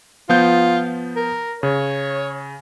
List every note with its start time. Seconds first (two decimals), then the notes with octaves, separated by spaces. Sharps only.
0.29 F3 B3 F4 G6
1.16 A#4
1.63 C#3 C#5